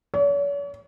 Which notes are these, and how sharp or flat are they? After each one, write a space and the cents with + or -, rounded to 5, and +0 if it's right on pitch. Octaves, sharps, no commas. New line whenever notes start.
C#5 +45